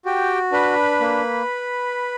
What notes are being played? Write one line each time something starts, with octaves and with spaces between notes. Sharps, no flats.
F#4 G4 G5
D4 B4 B5
A#3